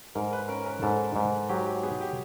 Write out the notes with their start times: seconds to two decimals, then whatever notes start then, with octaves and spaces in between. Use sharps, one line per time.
0.15 G#2 A#4
0.33 B4
0.48 C#4 A#4
0.66 A#4
0.82 G#2 A4
1.16 G#2
1.49 F#3 G4
1.66 G4
1.83 B3 G#4
2.01 G4